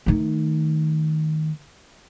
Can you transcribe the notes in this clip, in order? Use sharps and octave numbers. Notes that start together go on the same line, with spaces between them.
D#3 A3